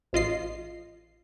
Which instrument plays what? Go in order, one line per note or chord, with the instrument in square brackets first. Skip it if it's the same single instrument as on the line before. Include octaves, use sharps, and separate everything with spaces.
[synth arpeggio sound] A1 F4 D#5 C7